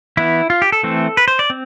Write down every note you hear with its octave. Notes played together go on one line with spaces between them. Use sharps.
E3 B3 E4
F4
G4
A4
E3 A3 C4
B4
C5
D5
C4